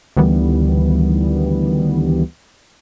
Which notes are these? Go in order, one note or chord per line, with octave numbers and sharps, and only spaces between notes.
D2 D#3 E3 G3 B3